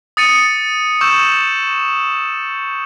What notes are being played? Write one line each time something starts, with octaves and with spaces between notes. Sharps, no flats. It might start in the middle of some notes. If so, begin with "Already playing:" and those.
D#6 A6 C#7 D#7
C#6 E6 G6 E7